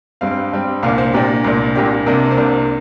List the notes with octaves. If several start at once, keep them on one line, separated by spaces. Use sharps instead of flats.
G2 G3 C4 F5
G2 G3 C4
C2 A#2 A#3 D4 F5
C5
C2 A#2 A#3 D4 G4
C2 A#2 A#3 D4
C2 A#2 A#3 D4 G4
C2 C3 A#3 D4 A#4
C5
C2 C3 A#3 D4 A#4